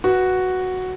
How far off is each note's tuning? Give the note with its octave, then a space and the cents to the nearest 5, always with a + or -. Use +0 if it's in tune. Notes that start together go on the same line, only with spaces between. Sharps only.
F#4 +0 B4 -10